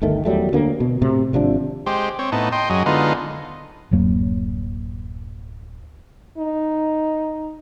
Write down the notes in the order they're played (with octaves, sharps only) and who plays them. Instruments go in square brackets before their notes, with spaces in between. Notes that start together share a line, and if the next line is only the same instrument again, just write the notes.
[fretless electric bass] G1 D2 D#3 A3
E2 F#3 G3 A3
D2 D3 A#3
B2
A2 C3
G#1 C3 F3 D4
[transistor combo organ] G#3 G4 C5
C4 C#5
A2 B3 D#4 A5
D#5 G5 C6
F#2 F#3 G#4 D#5
D3 G#3 B3 D#4 F4
[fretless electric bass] D1 F#2 F#3 A#3
[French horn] D#4